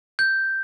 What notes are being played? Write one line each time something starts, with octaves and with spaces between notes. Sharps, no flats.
G6